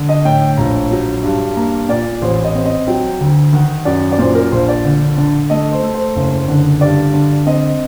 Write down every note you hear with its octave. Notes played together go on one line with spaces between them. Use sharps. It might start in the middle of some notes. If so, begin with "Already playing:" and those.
Already playing: D3
D#5
A2 G5
A#1 A#5
F#3
G2
A#3 A#5
A#2 D5
A1 C5
D#5
C4
D#5
F#3 G5
D2
D#3 F#5
F#2 D5
D5
A#2 C5
A#4
A#1 C5
D5
D3
D3
A3 D#5
C5
A3
C5
F#1
D3
G2 D5
D3
C4 D#5